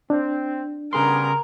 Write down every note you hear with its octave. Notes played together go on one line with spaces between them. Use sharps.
C4 D4
C#3 G3 B3 G#4 A#4 G#5 C6